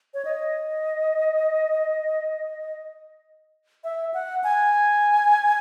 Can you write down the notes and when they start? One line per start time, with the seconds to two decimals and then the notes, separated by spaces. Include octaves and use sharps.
0.14 C#5
0.25 D#5
3.84 E5
4.14 F#5
4.44 G#5